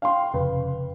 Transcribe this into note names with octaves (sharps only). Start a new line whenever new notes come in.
F5 G5 C6
F1 C#3 B4